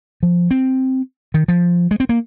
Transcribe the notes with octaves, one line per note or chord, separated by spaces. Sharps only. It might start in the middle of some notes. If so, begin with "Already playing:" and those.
F3
C4
D#3
F3
G#3
C4
A#3